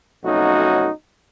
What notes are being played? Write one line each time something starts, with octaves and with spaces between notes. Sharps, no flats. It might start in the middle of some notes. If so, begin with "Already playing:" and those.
B1 F2 A3 C#4 D#4 F#4